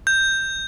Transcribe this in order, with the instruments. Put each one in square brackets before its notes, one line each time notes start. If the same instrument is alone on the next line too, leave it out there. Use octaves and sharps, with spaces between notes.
[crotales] G6